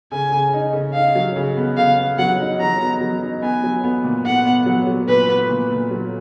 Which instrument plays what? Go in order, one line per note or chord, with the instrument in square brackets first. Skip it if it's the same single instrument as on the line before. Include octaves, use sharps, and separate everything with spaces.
[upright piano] C#3 [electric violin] G#5
[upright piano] C#3
D#4
C#3
[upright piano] D#4 [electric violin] F5
[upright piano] F#3
C#3
B3
[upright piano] C#3 [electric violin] F5
[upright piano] B3
[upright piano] F#3 [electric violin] F#5
[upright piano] D#4
[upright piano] F#3 [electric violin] A#5
[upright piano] B3
F#3
D#4
[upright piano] B3 [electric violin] G#5
[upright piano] F#3
B3
A#2
[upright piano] B3 [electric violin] F#5
[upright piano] B3
F#3
F#3
[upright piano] A#2 [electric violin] B4
[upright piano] B3
A#2
A#2
F#3